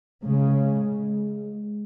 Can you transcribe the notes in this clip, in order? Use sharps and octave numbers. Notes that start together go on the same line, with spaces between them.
C#3 G#3